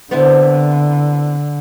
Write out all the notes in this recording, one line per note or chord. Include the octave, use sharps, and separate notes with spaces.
D3 B3 C4 E4